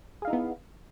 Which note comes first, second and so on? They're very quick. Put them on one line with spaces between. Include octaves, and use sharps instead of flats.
G#4 F5 D#4 E4 B3